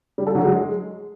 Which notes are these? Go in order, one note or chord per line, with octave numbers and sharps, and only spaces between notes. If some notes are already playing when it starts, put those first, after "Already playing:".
G3
A4
F#3
G#3